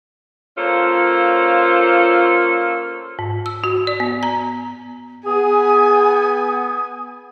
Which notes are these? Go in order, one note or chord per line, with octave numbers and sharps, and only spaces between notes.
A#3 C#4 F4 A4 C5
G#2
E6
F#4
D5
B3
A#5
B3 G#4 G#5 D#6